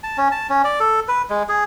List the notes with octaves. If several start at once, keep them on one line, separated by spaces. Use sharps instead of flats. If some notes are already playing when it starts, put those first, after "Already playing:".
A5
C#4
A5
C#4
D5
A4
B4
G#3
G#4